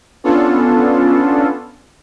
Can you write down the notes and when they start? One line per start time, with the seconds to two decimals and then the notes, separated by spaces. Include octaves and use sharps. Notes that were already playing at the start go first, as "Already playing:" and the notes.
0.24 B3 C#4 D4 F4 A4